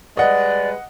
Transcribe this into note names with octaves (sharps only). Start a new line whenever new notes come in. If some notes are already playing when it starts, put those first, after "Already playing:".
G3 G#3 B4 D5 D#5 F#5